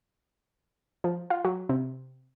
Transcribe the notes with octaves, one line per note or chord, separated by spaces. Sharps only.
F3
F4
F#3
C3